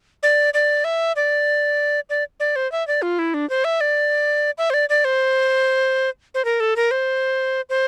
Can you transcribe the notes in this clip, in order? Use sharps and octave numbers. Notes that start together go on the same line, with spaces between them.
D5
D5
E5
D5
D5
D5
C5
E5
D5
F4
E4
D4
C5
E5
D5
E5
C5
D5
D5
C5
C5
A#4
A4
A#4
C5
C5